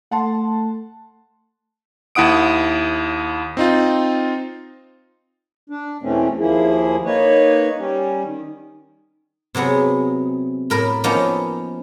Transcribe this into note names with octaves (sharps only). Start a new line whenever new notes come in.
A3 F#5 A5 C6
D#2 E4 F#5 D#6 D7
C4 D#4 F4
D4
E2 B2 E3 A3 C4 C#4
D#2 F3 A#3 E4 G#4
A#3 D#4 B4 C#5
G3 C#4
D#3
C3 F#3 B3 G#4
A2 A#4 B5
F3 A#3 B3 C#4 D#4